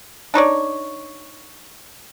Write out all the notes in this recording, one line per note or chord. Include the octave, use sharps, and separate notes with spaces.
D4 D#4 C#5 D5